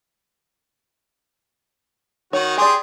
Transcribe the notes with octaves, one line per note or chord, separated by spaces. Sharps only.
D#3 F#4 C#5
G4 G#4 D5 G5 C6